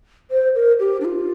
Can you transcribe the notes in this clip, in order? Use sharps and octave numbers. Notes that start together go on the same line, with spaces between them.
C5
A#4
G4
D4
F4